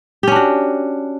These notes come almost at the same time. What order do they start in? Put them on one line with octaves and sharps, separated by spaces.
G4 C#4 D4 F#4